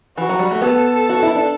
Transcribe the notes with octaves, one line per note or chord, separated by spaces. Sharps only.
E3 F#4
F#3
G3
A3
B3 A4
F#4
E4
D4